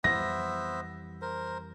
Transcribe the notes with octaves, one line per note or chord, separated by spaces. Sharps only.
F2 E3 G3 B3 C5 E5 A#6
A#4 C5